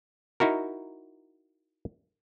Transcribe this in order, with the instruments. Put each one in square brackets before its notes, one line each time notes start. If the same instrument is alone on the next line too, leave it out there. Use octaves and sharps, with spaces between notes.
[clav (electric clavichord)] D#4 E4 F#4 A#4